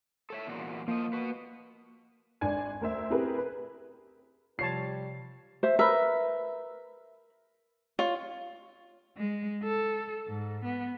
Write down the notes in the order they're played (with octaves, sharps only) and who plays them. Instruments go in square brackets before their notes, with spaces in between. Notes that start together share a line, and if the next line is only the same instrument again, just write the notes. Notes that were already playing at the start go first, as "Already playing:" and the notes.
[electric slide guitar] A4 C#5 E5
E2 A#2 F#4
[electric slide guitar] F3 D#5 [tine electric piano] A#3
[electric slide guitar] F#4 B4
[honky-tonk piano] G#1 D4 G#5 G#6
D2 A#4 C5 E5
C4 E4 G4 G#4 A#4 B4
B4
[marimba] C3 F3 [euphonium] G3 [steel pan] F4 C#5 A5 [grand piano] C7
[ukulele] C5 E5
[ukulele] A#4 B4 [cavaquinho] E5
[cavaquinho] F4 [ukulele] C#5
[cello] G#3
A4
G#2
B3